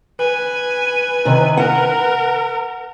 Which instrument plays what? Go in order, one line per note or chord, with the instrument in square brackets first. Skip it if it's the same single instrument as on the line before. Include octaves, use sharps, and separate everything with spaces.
[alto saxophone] B4 [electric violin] G#5
[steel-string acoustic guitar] C3 D#3
[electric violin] A#4 [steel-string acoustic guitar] F#5